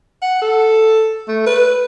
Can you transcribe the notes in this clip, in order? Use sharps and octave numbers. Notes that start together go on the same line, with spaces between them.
F#5
A4
A3
B4